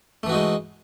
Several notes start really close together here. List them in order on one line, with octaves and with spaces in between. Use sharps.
A3 E3 F#4 D#4 G#3